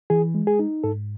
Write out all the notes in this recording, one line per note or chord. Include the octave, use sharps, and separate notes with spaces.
E3 G#4
G#3
G#4
D#4
G#2 A4